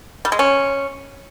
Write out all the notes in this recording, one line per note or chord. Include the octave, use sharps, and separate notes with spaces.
G3
G#3
C#4